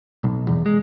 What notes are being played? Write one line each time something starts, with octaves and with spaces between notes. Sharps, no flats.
B1
E2
G#3